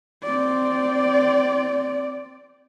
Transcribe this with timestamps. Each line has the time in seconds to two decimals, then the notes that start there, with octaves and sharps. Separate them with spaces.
0.24 C4 D5